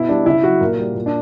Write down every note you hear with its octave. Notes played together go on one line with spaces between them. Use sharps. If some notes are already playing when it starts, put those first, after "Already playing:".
Already playing: B2 E4
G3 D4
C#3 E4
F#3 F#4
A#2 A#4
G3
A#2
D4